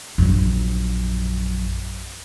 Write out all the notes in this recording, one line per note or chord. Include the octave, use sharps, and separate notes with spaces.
A#1 F#2